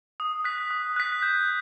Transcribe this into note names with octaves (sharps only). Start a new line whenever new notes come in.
D#6
F#6 B6
D#6
F#6 B6
G6